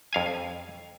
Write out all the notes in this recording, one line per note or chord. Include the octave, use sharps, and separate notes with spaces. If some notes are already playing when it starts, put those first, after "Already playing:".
F2 F5 G#5